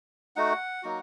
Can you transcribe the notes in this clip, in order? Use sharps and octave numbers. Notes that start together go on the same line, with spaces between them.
A3 D#4 F#4 F#5
F#3 A#3 D#4 F#4